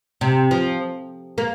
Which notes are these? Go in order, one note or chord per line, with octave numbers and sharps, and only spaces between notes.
C3
F3
A#3